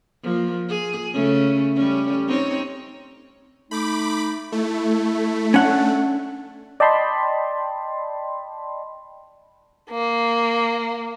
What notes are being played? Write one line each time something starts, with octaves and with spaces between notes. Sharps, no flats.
F3 A#3
G#4
C#3 A3 C#4
G3 C#4
C4 D#4 C#5
A3 D#4 B5 D6
A3 E4
C#4 D4 F#5
D5 D#5 G5 A5 B5 C6
A#3